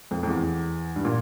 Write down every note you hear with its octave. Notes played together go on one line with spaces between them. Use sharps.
F2
F2
E2
G2
A#2